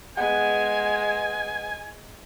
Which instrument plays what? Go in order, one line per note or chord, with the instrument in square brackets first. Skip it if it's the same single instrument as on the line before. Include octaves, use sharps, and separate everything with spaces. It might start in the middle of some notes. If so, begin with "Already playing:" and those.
[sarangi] G#3 [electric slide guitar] B4 F#5 [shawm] G#5